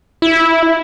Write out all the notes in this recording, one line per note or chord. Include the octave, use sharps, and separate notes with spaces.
E4